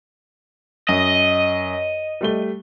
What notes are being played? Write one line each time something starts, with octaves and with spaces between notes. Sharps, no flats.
F#2 D#5
G3 A3 G7